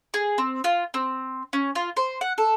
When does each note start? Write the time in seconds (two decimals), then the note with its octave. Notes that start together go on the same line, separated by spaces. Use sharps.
0.14 G#4
0.38 C4
0.64 F4
0.94 C4
1.53 C#4
1.75 F4
1.97 C5
2.21 F#5
2.38 A4